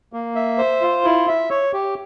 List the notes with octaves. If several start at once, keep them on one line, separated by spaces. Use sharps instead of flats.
A#3
E5
C5
F4
E4
E5
C#5
G4